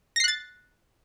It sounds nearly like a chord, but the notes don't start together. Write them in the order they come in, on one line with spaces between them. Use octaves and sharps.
A#6 C7 F#6 A6